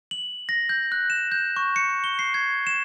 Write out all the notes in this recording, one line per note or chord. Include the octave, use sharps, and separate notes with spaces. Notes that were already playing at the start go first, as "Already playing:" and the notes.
F#7
A#6
G6
F#6
E7
G6
C#6
C#7
G7
C7
G#6
E7